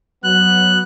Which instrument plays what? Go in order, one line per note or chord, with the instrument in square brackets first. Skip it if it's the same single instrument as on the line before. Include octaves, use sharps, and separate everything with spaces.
[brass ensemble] F#3 B3 [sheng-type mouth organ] F#6